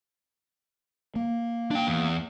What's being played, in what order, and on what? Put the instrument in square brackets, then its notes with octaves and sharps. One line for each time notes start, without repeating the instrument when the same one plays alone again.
[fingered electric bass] A#3
[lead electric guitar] D4 G5
E2